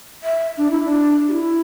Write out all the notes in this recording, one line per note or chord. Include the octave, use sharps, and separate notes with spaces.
E5
D4
E4
D4
G4
E4